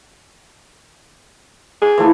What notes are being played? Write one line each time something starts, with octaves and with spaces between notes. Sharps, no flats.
G#4
E3 F3 A3